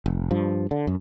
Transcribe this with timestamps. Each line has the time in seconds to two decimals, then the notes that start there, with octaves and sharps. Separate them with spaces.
0.06 F1
0.31 G2 F3
0.71 D3
0.87 F#2